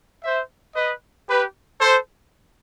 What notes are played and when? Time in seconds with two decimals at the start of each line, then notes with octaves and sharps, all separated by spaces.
0.24 C5 E5
0.76 B4 D#5
1.28 G4 B4
1.81 A4 C5